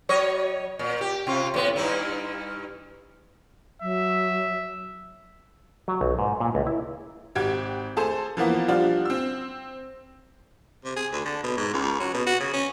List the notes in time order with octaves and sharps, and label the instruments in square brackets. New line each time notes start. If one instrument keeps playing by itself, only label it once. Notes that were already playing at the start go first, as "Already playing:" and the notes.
[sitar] F#3 C#5 D#5
A#2
G4
C3 F4
A2 B3
G2 D#4 E4
[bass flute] F#3 [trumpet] E5
[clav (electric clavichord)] F#3
B1
G#2
A#2
C#2
E4
[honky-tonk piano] G#1 F#4 G4 G#6
A3 G#4 A4 C5
E3 F3 A#3 B3
F3 G3 D4 F4 F#4
C4 E6
[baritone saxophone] C3
G#4
D2
D3
B2
G#2
C#2
F#3
B2
F#4
C#3
C#4